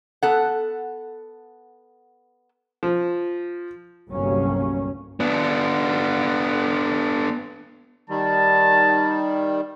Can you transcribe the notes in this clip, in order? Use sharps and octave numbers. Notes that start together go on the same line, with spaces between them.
B3 A4 F#5
F3
G1 C2 F#3 A#3 C#4
B3 D4
D#3 G3 A5